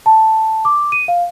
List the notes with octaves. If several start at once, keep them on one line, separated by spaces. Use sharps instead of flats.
A5
D6
D#7
F5